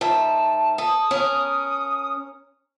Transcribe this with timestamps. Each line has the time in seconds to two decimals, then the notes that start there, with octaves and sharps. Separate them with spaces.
0.01 G#2 E5 A5
0.78 A4 D#6
1.11 C#4 A#4